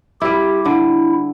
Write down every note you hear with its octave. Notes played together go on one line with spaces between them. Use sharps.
G3 E4 G4
D3 E4